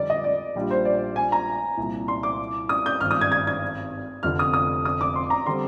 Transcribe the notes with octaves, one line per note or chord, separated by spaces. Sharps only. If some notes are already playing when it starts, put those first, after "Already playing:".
Already playing: F2 D3 G3 C4 D#4 D5
D#5
D5
A#1 A#2 G3 D4 F4
C5
D5
G#5
A#5
C2 A#2 F3
C6
D6
D#6
G6
G#1 G2 F3 F6
D#6
G#6
G#6
G#6
F1 F2 D3 F6
D#6
D#6
D#6
D6
C6
A#5
D3 G3 C4 C6